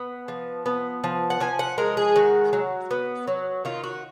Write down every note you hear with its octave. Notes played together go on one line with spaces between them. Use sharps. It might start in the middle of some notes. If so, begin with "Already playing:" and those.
Already playing: B3
F3
B3
F3
F#5
F3 G#5
F#5
G#3 A#4
G#4
D#3 F#4
F#3
B3
F#3
D#3 F4
F#4